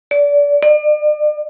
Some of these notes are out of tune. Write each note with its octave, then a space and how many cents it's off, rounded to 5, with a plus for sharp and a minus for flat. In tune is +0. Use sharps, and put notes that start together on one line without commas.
D5 -25
D5 +40